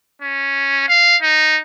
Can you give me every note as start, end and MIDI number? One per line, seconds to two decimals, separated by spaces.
0.22 0.84 61
0.89 1.17 77
1.22 1.60 63